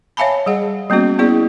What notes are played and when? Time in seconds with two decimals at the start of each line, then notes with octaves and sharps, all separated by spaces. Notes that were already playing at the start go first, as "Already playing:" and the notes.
0.17 C#5 E5 F5 G#5 A5 B5
0.46 G3 G#4 F#5
0.90 G3 A#3 B3 C#4 F#4
1.19 B3 E4 G#4 D5